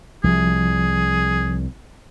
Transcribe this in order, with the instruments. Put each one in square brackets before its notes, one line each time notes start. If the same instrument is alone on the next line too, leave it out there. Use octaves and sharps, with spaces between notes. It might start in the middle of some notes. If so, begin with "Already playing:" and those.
[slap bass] C2 [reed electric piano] F3 [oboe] G#4